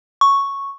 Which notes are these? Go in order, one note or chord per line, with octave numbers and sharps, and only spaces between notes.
C#6